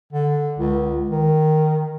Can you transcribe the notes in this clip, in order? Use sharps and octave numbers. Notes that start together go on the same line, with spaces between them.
D3
C#2
D#3